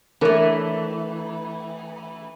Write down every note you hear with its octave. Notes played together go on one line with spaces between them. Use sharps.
E3 A3 D4 A#4 C#5